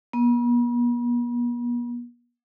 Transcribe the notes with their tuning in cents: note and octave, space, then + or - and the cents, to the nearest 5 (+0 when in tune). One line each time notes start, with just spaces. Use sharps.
B3 -45